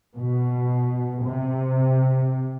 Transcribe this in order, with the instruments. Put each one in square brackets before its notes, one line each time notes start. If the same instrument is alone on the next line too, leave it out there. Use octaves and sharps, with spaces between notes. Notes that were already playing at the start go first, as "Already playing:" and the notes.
[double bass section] B2
C3